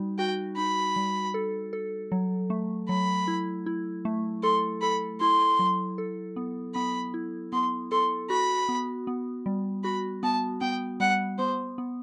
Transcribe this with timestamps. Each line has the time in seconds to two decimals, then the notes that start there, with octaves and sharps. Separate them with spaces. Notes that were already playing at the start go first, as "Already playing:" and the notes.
Already playing: G3 D#4 F#4
0.18 F#4 G5
0.57 D#4 B5
0.96 G3
1.34 A4
1.73 A4
2.12 F#3
2.50 A3
2.89 F#3 B5
3.28 E4
3.66 E4
4.05 A3
4.43 A4 C6
4.82 A4 B5
5.20 E4 C6
5.59 F#3
5.98 A4
6.36 B3
6.75 B3 B5
7.14 E4
7.53 B3 C6
7.92 A4 C6
8.30 F#4 B5
8.69 B3
9.07 B3
9.46 G3
9.84 F#4 B5
10.23 B3 A5
10.61 B3 G5
11.00 G3 F#5
11.38 B3 C5
11.78 B3